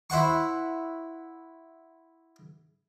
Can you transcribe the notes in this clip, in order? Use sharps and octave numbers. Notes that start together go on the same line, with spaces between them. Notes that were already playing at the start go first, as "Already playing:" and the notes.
E4 C5 F#5 C#6